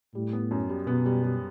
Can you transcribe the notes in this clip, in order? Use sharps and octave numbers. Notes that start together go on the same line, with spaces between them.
A2 G3
B3
F#2
G3
B2 B3
G3
G3